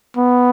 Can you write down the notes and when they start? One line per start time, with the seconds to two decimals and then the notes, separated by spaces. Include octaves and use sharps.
0.17 B3